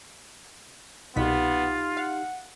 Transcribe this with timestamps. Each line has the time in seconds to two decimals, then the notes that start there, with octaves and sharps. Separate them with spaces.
1.16 C2 B2 B3 D#4 F4 G4 B6
1.97 F5 F#5